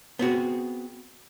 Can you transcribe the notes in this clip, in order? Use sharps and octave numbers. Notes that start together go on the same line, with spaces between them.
B3 C4 F#4 G#4